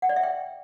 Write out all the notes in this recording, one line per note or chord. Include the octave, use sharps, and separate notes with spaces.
F#5
D5
E5
G5